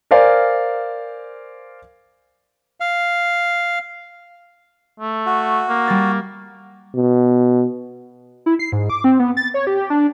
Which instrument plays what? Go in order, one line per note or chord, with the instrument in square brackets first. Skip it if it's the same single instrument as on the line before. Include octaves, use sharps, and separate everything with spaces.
[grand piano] A#4 C5 D5 F5 G#5
[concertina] F5
[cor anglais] A3
[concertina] F#4
[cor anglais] A#3
[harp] G3 A6
[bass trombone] B2
[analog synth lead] E4
C7
G#2
D6
C4
B3
A6
C#5
G4
D4